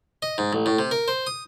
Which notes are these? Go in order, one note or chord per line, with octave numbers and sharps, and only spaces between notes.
D#5
G#2
A1
A2
C3
A#4
C5
D#6